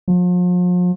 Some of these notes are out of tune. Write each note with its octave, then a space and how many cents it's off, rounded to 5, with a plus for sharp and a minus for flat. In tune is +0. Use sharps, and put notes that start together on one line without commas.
F3 +40